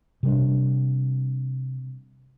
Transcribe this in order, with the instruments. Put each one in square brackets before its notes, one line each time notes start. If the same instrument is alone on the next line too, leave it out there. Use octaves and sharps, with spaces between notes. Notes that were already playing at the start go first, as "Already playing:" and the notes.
[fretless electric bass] C3 G3 D4